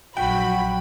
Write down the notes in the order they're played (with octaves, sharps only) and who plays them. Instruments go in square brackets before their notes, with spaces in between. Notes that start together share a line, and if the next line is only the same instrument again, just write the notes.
[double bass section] A#1 F#3 [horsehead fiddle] F#4 [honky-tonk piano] G5 [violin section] B5